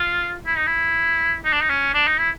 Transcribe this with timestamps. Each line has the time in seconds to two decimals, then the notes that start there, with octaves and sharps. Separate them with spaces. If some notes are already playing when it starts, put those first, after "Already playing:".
Already playing: F4
0.46 E4
0.57 D#4
0.67 E4
1.44 D#4
1.53 D4
1.61 D#4
1.70 C#4
1.94 D4
2.07 D#4
2.19 E4